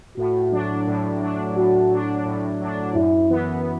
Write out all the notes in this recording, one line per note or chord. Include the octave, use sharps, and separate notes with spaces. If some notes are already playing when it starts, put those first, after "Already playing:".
A2 F#4
F#3 D4
A2
F#3 D4
A2 F#4
F#3 D4
A2
F#3 D4
F#2 E4
E3 B3